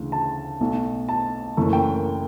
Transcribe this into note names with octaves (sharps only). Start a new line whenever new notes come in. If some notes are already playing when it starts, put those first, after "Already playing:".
Already playing: D2 C#3 E3
A5
B1 B2 A3
A5
F#1 F#2 E3 A3
G5